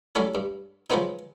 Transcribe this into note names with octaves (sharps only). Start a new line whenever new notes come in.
F#3 G3 A3 C#4 E4
G2
F3 F#3 G#3 B3 C4 D#4